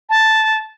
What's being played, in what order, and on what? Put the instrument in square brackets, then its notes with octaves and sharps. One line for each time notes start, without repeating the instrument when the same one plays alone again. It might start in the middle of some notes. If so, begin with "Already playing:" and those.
[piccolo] A5